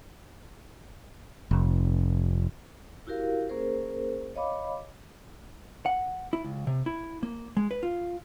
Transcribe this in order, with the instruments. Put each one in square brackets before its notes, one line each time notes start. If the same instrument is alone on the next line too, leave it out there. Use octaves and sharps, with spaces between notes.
[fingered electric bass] F1
[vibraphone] E4 F#4 G4 A#4 F5
A#3 C#4 G#4 A#4 C5
C#5 D#5 F5 B5 D6
[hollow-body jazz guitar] F#5
E4
C#2
C3
E4
A#3
G#3
B4
F4